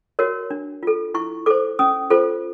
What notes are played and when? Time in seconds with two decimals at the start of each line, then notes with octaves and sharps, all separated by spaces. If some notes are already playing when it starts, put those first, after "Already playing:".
0.19 F#4 A#4 C#5
0.50 D4
0.83 F4 A4
1.14 E4 C#6
1.46 A4 C5 D6
1.79 C#4 D#6
2.10 F4 A4 C5